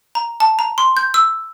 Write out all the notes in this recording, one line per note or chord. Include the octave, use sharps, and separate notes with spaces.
A#5
A5
A#5
C6
G6
E6